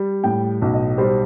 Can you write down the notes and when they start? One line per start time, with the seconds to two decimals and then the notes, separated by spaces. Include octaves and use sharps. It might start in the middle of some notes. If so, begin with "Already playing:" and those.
Already playing: G3
0.24 A2 G5
0.62 B1
0.73 D#5
0.98 G3 C5